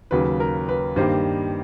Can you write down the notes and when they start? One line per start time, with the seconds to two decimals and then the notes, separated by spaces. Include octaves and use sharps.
0.11 D#2 C#3 F#3 B4
0.40 A#4
0.69 B4
0.96 G2 D#3 G3 A#3 C5